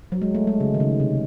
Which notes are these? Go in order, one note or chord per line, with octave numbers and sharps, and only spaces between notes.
F#3
G#3
A3
G#3
C#3
D#3
C#3
C3